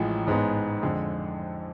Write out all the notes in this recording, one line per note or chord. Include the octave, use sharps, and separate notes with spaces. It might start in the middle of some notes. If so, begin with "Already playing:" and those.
Already playing: A1 A2 F3 G#3
A1 G#2 G#3 B3
F2 D3 G#3